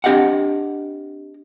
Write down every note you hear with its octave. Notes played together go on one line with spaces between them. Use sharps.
C4 D4 G4 D#5 F5 F#5